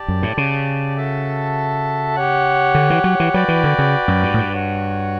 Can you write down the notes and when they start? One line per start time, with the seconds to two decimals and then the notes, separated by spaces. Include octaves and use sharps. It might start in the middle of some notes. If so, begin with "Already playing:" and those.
Already playing: G4 D5 A5
0.08 F#2
0.23 A2
0.37 C#3
0.97 F#4 A4 E5 A5
2.16 G4 C#5 F#5
2.75 D3
2.90 E3
3.04 F#3
3.20 E3
3.34 F#3 F#4 B4 D5 G5
3.48 E3
3.64 D3
3.78 C#3
4.08 F#2
4.23 G2
4.34 A2
4.38 G2
4.53 F#4 C#5 F#5